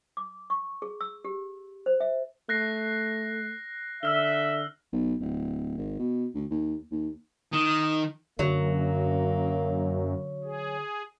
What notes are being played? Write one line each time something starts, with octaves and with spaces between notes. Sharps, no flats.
D6
C#6
G#4
E6
G4
C5
E5
A3 F#6 A#6 C7
D3 E5 E6 F6 G7
B1
D1
G#1
B2
D2
D#2
D#2
D#3 D#6
F#2 D3 F#3 A#3
G#4